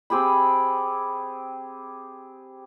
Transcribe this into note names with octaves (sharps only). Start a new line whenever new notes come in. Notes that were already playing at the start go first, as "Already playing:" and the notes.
C4 G4 G#4 B5